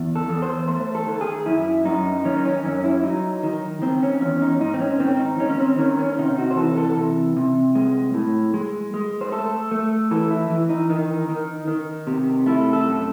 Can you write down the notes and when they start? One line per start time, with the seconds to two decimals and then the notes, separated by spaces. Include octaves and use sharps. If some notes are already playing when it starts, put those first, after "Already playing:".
Already playing: E2
0.15 A4
0.29 E2
0.42 C5
0.68 A3 C5
0.95 A4
1.07 D#3
1.21 G#4
1.46 F#2 E4
1.85 F#2 D#4
2.25 D#3 C#4
2.37 D#4
2.45 C#4
2.65 F#2 C#4
2.84 E4
3.03 F#3 D#4
3.43 D#3
3.82 D#3 C4
4.02 C#4
4.21 E2 C#4
4.42 D#4
4.61 G#2 D#4
4.74 C4
4.80 C#4
5.00 D#3 C4
5.19 D#4
5.39 D#3 C#4
5.50 C#4
5.59 C4
5.79 D#3 C#4
5.99 C#4
6.13 C#4
6.19 C3 D#4
6.38 F#4
6.51 C5
6.57 E3 A4
6.78 A4
6.97 C3
7.37 C3
7.75 G#3
8.14 A2
8.54 G#3
8.94 G#3
9.21 C5
9.32 A3 A4
9.71 A3
10.11 E3 A4
10.31 E4
10.50 E3
10.69 D#4
10.90 D#3
11.29 D#3
11.68 D#3
12.07 C3
12.46 A3 E4
12.73 A4
12.86 F#2